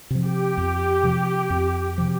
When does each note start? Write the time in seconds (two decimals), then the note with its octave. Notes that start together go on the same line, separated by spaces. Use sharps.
0.10 C3 F3
0.26 G4
0.57 F2
1.03 C3 F3
1.50 F2
1.98 C3 F3